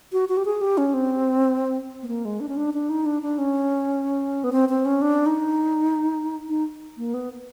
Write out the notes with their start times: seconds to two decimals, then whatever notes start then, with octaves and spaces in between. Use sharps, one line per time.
0.13 F#4
0.29 F#4
0.37 G4
0.45 G#4
0.61 G4
0.78 C#4
0.94 C4
2.03 B3
2.08 A#3
2.25 G#3
2.40 D4
2.49 C#4
2.57 D4
2.74 D4
2.90 D#4
3.06 D4
3.22 D4
3.38 C#4
4.44 B3
4.52 C4
4.69 C4
4.85 C#4
5.02 D4
5.26 D#4
6.49 D#4
6.97 A#3
7.14 B3